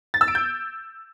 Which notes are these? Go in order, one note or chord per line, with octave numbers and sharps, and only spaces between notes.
A6
E6
D7
G6